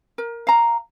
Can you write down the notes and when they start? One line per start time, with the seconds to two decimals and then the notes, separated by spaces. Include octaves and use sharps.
0.18 A#4
0.47 F5 A#5